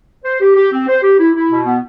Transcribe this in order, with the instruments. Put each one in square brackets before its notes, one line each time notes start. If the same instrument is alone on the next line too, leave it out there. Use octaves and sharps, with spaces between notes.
[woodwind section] C5
G4
G4
C4
C5
G4
E4
E4
B2
B3